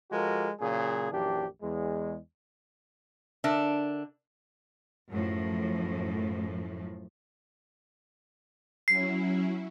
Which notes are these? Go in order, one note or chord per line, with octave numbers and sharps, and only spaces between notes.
F3 G#3 F4 F#4 A4 A#4
A#2 C#3 F#3 G#4
A#1 F#2 E3 D4 G4
E2 G#3
D3 D4 A#4 E5
F#2 A2 F3
F#3 C#4 E4 C7